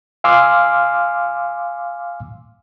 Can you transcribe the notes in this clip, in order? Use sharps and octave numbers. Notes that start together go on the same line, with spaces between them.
F5 G#5 C6 D6 E6 F6